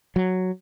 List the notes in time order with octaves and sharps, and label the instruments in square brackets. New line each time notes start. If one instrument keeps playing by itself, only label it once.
[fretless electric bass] F#3